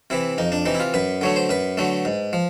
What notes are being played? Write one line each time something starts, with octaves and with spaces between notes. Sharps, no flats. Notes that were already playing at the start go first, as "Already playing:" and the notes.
C3 E3 E4
F2 D#4
D4
C3 E3 D#4
E4
F4
F#2 B4
D3 F#3 A3 C#5
C5
F#2 B4
D3 F#3 A3
G#2
F3